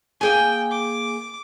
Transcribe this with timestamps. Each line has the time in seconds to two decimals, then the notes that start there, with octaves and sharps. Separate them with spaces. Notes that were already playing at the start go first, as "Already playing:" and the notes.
0.21 A#3 G#4 G5 G#5
0.71 D6